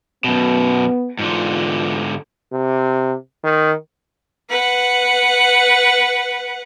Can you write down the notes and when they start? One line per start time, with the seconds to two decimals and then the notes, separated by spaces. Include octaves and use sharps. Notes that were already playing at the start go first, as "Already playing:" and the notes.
0.24 F#2 B2 B3
1.19 G#2 D3 E3 F4
2.52 C3
3.44 D#3
4.50 B4 F#5